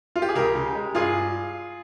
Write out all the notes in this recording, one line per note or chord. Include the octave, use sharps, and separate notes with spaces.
F4
G4
G#4
C#2 G4 A#4
C#3
G#3
G2 F4 G#4